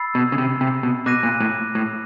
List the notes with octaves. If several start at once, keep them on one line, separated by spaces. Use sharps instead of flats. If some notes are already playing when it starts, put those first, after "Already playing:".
Already playing: B5 E6 A6 C7
B2
C#3
C3
C3
B2
B2 D6 F#6 A#6 D#7
A#2
A2
A2